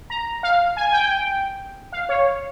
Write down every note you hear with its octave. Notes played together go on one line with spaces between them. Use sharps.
A#5
F5
G#5
G#5
G5
F5
C#5